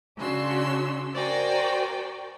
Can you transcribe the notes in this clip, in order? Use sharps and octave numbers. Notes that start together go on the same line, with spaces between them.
C#3 D4 F#4 C6 E6
F#4 A#4 C5 D5 G5 G#5